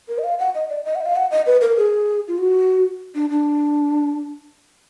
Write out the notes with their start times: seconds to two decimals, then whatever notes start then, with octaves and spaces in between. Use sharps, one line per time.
0.08 A#4
0.18 D#5
0.24 F5
0.39 F#5
0.55 D#5
0.69 D5
0.85 D#5
0.95 F#5
1.01 D#5
1.05 F5
1.16 F#5
1.31 D#5
1.46 B4
1.61 A#4
1.77 G#4
2.28 F4
2.38 F#4
3.15 D4
3.30 D4